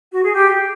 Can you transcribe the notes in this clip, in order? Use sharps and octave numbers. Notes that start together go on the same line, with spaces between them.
F#4
G#4
G4